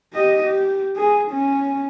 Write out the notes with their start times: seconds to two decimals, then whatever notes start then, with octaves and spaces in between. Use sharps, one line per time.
0.14 G4 D#5
0.43 G4
0.96 G#4
1.32 C#4